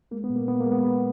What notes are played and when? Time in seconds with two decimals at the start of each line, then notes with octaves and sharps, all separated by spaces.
0.11 G#3 A#3
0.24 B3
0.30 A#2
0.36 A#3
0.48 A#2 B3
0.60 A#3
0.66 G#3
0.72 B3
0.84 G#3 B3